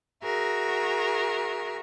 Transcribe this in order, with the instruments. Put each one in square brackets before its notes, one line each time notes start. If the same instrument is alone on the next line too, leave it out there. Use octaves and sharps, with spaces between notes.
[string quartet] F#4 G#4 A#4 E5